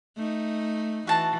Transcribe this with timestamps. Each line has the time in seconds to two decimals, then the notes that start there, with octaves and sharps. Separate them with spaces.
0.17 A3 D#4
1.07 E3 F#4 A5